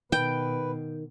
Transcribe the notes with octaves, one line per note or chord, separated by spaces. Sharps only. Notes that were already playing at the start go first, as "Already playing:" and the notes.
B2 D#3 B4 G5